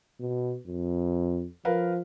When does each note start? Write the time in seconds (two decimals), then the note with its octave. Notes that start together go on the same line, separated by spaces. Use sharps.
0.20 B2
0.66 F2
1.65 F3 A#4 B4 F5